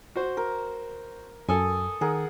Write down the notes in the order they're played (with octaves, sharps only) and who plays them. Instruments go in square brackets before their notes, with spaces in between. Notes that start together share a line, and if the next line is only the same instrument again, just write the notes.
[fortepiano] F#4 C5
[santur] A#4
[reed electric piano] F#2 [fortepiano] A4 G#5 [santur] D#6
[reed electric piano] D#3 [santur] G#4 A#4 F#5